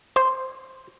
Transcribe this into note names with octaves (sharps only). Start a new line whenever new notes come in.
C5